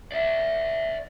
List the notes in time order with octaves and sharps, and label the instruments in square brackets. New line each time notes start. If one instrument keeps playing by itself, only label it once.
[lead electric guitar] D5 E5